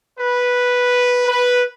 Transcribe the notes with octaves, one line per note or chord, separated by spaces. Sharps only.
B4
B4